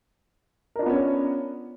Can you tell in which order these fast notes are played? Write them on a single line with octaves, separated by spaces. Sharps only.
A#4 D4 F4 B3 C#4